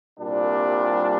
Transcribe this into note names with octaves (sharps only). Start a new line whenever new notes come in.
C2 A#2 G3 D4